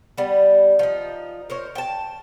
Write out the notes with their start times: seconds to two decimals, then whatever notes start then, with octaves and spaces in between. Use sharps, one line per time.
0.17 G3 B3
0.79 F3 D#4
1.50 A#4 C5 C#5
1.75 G5 A5